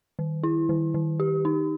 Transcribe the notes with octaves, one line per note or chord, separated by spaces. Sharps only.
D#3
E4
D#3
D#3
G4
D#4